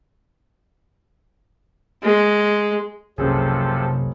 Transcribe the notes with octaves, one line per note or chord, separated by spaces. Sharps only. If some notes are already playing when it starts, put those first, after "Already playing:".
G#3
F#1 C2 C3 F3 C#4 G#4 A4